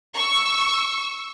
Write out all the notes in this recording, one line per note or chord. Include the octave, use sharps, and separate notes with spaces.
C#6 E6